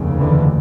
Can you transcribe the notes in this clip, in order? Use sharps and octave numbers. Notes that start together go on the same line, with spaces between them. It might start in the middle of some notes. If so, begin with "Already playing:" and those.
Already playing: F1 D#2 C#3
D3 E3